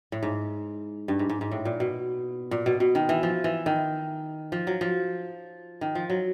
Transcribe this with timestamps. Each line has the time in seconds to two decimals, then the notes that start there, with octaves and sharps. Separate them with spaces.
0.12 A2
0.23 G#2
1.08 G2
1.19 G#2
1.29 G#2
1.41 G#2
1.51 A2
1.65 A#2
1.80 B2
2.51 A#2
2.66 B2
2.80 B2
2.95 D#3
3.09 E3
3.23 F3
3.44 E3
3.66 D#3
4.52 F3
4.67 F#3
4.81 F3
5.81 D#3
5.95 F3
6.10 F#3